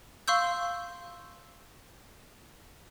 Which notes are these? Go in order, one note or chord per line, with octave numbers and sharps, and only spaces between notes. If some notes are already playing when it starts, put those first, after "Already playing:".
F5 C6 C#6 E6 G6